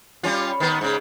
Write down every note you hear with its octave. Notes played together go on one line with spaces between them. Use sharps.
G3 C#4 F4
D#3 B3
G#2 C#3